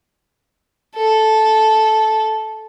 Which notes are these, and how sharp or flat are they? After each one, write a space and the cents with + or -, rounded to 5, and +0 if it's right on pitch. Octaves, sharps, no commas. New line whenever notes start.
A4 -10